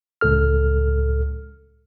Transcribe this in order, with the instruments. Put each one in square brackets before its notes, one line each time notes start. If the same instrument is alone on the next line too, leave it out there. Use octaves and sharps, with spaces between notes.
[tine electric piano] C#2 A2 A4 F6